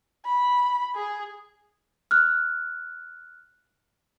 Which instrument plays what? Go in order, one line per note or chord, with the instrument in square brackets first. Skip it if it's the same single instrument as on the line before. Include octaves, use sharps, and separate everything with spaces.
[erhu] B5
G#4
[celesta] F6 F#6